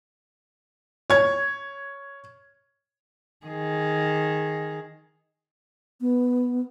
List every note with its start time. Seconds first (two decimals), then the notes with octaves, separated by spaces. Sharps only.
1.10 C#5 G#6
3.46 D#3 G#4
6.01 B3